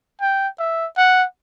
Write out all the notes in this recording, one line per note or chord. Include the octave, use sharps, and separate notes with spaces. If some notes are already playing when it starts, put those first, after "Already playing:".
G5
E5
F#5